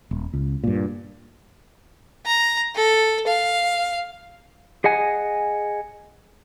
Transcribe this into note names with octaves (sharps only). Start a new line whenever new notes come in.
D#1
C#2
G2 A#2
A#5
A4
F5
G#4 D#5 F#5 G#5